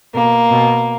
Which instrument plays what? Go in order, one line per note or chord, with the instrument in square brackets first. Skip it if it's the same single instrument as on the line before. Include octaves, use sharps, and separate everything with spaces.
[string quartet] B2 A#3
B2